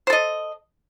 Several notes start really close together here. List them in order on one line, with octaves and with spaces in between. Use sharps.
C5 A4 D#5